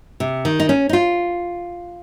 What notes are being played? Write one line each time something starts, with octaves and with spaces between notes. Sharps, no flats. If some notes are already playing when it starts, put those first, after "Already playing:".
C3
D#3
D#4
C#4
D#4
F4